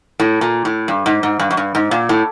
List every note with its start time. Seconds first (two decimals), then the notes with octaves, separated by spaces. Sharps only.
0.20 A2
0.41 A#2
0.65 A2
0.88 G2
1.06 G#2
1.23 G#2
1.40 G2
1.51 F#2
1.57 G2
1.75 G#2
1.91 A#2
2.09 A2